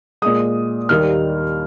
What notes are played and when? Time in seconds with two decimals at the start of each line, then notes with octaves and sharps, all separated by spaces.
0.22 A#2 G#3 D#6
0.89 D#2 D#3 G3 A#3 F6